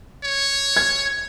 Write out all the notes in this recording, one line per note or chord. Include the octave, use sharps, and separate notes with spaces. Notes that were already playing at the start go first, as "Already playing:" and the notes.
C#5
G#6